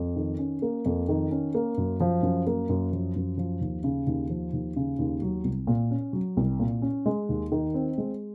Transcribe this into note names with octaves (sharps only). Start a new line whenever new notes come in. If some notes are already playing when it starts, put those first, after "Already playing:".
Already playing: F2
D#3
C#4
A#3
F2
D#3
C#4
A#3
F#2
F3
F#2
A#3
F#2
F3
F#2
F3
D#2
C#3
D#2
F3
D#2
C#3
D#2
F#3
C2
A#2
C#4
F#3
C2
A#2
C#4
G#3
D#2
D#3
C4
G#3